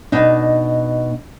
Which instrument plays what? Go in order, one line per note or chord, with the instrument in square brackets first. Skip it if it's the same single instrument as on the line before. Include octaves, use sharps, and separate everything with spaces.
[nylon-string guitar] B2 D4 D#4